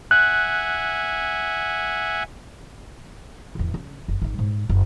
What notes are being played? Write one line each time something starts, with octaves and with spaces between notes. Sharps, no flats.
E5 F#5 G#5 F#6
D1 E2
C#3
F#1
G#1 D#4
G#2
F#1